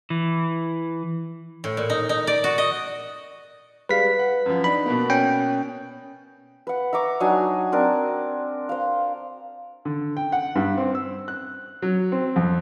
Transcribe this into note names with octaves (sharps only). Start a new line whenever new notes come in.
E3
A2
A#2
D#4
D#4
D5
F#4
D#5
G3 G#3 B4 F5 B6
F#5
F#2 F3
D4 D#4 B5
B2 A#3 B3
C#4 G5
B4 F#5
E5 A#5 C#6 D6
F#3 D4 D#4 G#5
C4 D4 A#4
C5 F5
D3
G5
F#5
G2
C4
E6
F#6
F#3
C4
F2